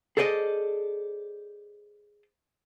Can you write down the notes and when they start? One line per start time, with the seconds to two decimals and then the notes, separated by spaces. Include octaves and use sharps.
0.17 G#4 A4 C5 D5 D#5